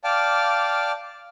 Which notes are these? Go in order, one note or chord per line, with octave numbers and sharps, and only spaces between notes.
D5 F5 G5 A5 D6 F6